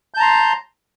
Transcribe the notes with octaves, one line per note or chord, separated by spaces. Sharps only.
A5 A#5 C6 G6